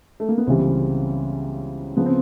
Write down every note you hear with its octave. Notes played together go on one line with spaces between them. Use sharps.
A3
A#3
B3
C#2 C#3 E3 G3 C4
C#3 F3 B3
C4